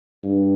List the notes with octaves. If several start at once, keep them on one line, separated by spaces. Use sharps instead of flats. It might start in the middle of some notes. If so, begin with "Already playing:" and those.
G2